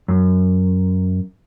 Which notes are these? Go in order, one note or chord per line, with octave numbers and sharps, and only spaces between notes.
F#2